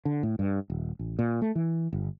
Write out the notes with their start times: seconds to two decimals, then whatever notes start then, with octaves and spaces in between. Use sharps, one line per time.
0.05 D3
0.23 A2
0.39 G2
0.70 D#1
0.99 A1
1.19 A#2
1.42 A3
1.55 E3
1.93 G1